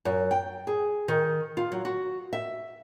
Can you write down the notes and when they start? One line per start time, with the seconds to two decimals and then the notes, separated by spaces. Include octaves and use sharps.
0.05 F#2
0.31 G5
0.67 G#4
1.08 D#3
1.57 F4
1.72 F#3
1.85 F#4
2.33 E5